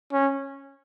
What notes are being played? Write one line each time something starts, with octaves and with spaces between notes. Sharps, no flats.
C#4